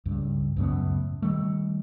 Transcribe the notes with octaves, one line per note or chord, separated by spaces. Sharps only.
C#2 G2
C#2 F#2 A2 B3
D#3 G3 A3